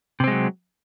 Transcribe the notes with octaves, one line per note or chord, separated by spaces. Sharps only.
C3 F#3 G#3 C4